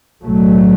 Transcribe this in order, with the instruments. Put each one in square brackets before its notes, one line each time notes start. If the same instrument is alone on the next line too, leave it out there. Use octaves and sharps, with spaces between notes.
[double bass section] B1 A2 F#3 A3